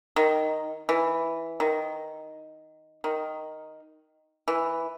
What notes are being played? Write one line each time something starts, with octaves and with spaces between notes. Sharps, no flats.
D#3
E3
D#3
D#3
E3